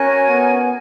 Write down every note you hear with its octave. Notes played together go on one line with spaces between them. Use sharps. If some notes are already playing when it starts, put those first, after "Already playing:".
Already playing: C#4 F#4 A#4 C#5 G#5
B3